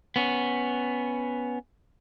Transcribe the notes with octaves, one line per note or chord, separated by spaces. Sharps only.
B3 C#4